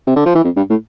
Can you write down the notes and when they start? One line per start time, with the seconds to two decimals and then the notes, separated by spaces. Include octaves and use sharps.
0.07 C3
0.16 D3
0.25 F3
0.35 E3
0.44 F2
0.57 G2
0.70 A2